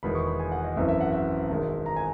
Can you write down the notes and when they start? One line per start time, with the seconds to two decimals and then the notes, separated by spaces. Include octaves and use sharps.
0.03 E1 E2 D#3 G#3 B5
0.15 C#6
0.27 B5
0.40 G#5
0.52 F#5
0.64 D#5
0.76 G#1 F#2 E3 E5
0.89 E5
1.01 F#5
1.13 E5
1.50 E1 E2 D#3 G#3
1.86 A#5
1.96 G#5